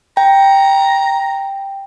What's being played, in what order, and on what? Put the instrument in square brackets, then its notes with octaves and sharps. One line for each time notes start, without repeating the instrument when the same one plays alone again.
[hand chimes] G5 [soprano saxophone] A#5